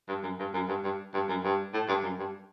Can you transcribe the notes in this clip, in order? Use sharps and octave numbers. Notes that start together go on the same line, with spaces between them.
G2
F#2
G2
F#2
G2
G2
G2
F#2
G2
A2
G2
F#2
G2